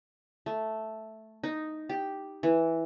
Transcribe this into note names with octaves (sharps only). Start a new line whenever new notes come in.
A3
D#4
G4
E3